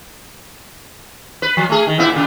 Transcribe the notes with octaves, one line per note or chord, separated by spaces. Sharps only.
B4
F3
A3 G#4
D#3
A#2 B3 E4
A#2 C#3